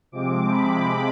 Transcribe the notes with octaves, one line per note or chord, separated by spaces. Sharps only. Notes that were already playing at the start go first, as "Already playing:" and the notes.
C3 F3 G#3 C4 D6
B5